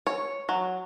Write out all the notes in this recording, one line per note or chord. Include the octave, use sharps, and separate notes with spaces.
C#5
F#3